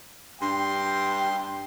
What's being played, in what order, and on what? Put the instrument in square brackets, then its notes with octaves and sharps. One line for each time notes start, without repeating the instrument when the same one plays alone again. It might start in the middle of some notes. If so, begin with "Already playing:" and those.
[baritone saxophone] G2 [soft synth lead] D4 [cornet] G5 [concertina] C6